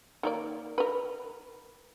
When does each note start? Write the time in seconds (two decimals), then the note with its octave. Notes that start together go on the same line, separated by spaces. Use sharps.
0.23 D#3 A#3 D5
0.78 A#4 B4